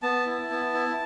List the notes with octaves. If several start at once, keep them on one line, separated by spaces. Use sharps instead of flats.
B3 A5
E4
B3
E4